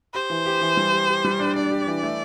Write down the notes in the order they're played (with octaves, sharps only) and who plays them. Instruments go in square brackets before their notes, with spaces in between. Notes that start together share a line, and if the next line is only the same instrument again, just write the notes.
[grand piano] G4 [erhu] C5
[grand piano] E3
G4
E3
G3
G4
G4
G3
D4
[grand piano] D4 [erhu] D5
[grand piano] G4
E3
A3